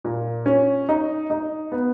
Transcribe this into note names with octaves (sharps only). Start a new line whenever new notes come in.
A#2
C#4
D#4
D#4
B3